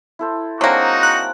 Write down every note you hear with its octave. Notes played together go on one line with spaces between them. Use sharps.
E4 A4 C5
F#3 A#3 C4 D4 D#4 F#4 G#4
F#6